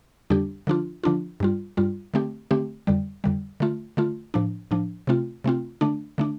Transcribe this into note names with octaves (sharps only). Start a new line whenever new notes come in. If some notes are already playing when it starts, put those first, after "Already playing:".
F2 D3 G3 D4 G4
D3 F3 D4 F4
D3 F3 D4 F4
G2 G3 F4
G2 G3 F4
D3 A3 C4 G4
D3 A3 C4 G4
F2 D3 G3
F2 D3 G3
D3 A3 F4
D3 A3 F4
A2 F3 D4
A2 F3 D4
C3 A3 C4 F4
C3 A3 C4 F4
D3 A3 D4
D3 A3 D4